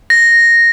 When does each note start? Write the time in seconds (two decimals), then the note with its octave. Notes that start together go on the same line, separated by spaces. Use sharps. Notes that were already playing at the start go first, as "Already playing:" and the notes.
0.10 A#6